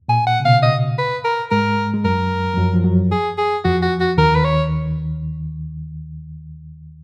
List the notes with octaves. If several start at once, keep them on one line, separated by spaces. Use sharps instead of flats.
A#2 G#5
F#5
C#3
B2 F5
D#5
B4
A#4
G#2 G#3 A#4
G#3
F#2 F#3 A#4
F3
F#2 F#3
F3
F#2 F#3
G#4
G#4
F2 F3 F#4
F#4
F#4
D#2 D#3 A#4
B4
C#5